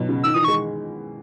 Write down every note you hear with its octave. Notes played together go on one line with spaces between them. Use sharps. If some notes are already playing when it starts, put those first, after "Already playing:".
Already playing: B2 F#3
C#3
D#3 E6
E3 D#6
D#3
G#3 C#6